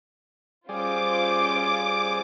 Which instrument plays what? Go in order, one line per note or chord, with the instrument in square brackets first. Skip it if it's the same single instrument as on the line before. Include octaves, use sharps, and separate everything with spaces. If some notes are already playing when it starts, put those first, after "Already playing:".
[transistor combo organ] G3 G#4 D5 [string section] C#4 F4 C5 [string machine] D6